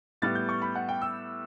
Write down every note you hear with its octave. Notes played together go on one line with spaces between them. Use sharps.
A2 G3 B3 A6
G6
C#6
B5
F#5
G5
E6